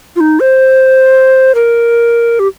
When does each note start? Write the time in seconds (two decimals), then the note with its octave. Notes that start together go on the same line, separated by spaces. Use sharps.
0.16 F4
0.20 D#4
0.40 C5
1.55 A#4
2.39 G4